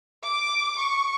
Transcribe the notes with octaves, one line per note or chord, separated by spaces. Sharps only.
D6
C#6